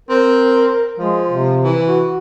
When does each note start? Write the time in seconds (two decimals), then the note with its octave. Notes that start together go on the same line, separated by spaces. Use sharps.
0.09 C4 A#4
0.98 F3 G#3
1.29 C3
1.63 E3
1.88 F#4